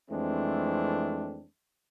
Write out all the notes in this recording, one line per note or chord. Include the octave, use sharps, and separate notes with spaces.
F2 E3 G#3 A3 C4 D4